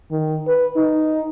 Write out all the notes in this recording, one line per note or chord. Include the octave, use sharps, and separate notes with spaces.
D#3
B4
D#4